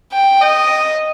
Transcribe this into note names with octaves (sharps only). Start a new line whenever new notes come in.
G5
D#5